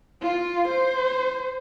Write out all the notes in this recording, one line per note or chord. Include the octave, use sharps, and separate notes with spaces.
F4
C5